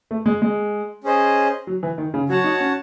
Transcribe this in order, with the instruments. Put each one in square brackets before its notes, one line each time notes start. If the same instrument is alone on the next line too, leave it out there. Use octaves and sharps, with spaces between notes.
[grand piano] A3
G#3
G#3
[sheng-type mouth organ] C#4 G#4 C5 D#5
[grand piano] F#3
E3
D#3
C#3
[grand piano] F#3 [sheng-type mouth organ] F#4 C#5 F#5 A5
[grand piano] D#4
C#4